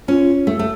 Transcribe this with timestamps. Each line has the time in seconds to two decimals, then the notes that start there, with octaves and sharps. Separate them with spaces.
0.08 C#4 F4
0.47 A3
0.59 A3